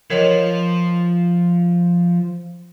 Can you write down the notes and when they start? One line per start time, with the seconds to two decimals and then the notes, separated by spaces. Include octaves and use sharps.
0.10 F3 A#4 C#5 D#5